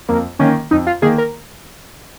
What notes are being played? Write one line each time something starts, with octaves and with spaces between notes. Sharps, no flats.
F2 A#3
D#3 A#3 C#4
F2 D#4
F4
D#3 A#3 G#4
A#4